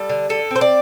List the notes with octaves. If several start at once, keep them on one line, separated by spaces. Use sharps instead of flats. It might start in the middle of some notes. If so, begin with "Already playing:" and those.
Already playing: G3 A4
D3
D3 A4
C4 C5
D5